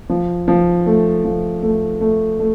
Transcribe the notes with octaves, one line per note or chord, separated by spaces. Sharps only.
F3
F3
A3
F3
A3
A3
A3